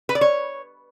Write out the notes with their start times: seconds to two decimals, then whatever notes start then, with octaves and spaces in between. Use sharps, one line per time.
0.09 B4
0.15 D5
0.21 C#5